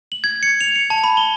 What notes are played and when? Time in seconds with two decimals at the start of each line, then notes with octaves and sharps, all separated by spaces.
0.12 F#7
0.24 G#6
0.43 C#7
0.61 F7
0.76 C#7
0.90 A5
1.04 B5
1.17 G7